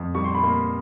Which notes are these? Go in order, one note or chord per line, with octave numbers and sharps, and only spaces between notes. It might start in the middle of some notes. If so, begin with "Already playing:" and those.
Already playing: F2
G3 C#6
C6
B5
A#3 C6